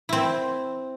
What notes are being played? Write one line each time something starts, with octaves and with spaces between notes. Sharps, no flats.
C4 E4